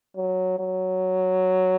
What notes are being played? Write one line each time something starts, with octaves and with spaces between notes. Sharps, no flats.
F#3
F#3